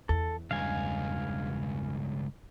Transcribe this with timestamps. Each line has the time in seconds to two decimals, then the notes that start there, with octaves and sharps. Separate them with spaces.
0.09 E2 A4
0.51 C#2 G2 F5 G#5